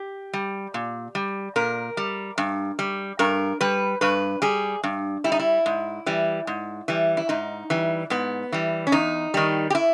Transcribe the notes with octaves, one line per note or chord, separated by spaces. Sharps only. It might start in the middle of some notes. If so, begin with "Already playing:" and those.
Already playing: G4
G3
A#2
G3
A#2 A#4
G3
G2
G3
G2 A#4
G3 B4
G2 B4
G3 G#4
G2
G3 E4
D#4
E4
G#2
E3 G3
G#2
E3 G3
E4
G#2 D#4
E3 G3
G#2 B3
E3 G3
C#4
E2 D#4
D#3 G3
G4
E4